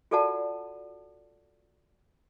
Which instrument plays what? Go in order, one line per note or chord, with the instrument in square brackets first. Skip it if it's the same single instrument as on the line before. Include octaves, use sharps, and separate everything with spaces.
[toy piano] F4 F#4 A4 D5 F#5 A5